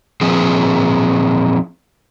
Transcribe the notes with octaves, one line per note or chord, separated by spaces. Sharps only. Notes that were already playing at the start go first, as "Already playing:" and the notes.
A#2 F3 C4 G#4